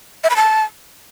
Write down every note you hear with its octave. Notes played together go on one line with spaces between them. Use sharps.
E5
B5
A5